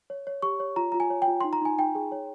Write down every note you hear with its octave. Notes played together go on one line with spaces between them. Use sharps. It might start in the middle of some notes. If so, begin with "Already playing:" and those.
C#5
C#5
G4 C#6
C#5
F4 A#5
F4 A#5
G#5
C#5
G5
F4
D#4 C6
A#5
D#4 G#5
D#4 G5
G#4
C#5